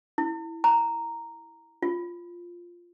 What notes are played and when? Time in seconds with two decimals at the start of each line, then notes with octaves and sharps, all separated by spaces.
0.18 E4
0.64 A#5
1.82 F4